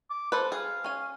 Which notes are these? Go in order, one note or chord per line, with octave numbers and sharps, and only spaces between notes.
D6
A4 B4 C5
G#4 F5
C#4 G#5